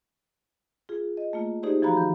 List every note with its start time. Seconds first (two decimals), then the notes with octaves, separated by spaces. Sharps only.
0.89 F4 G#4
1.17 D#5
1.33 A3 A#3 F4
1.63 D#4 G4 G#4 C5 D5
1.82 E3 F3 F#4 F5 A#5 B5
1.97 D#3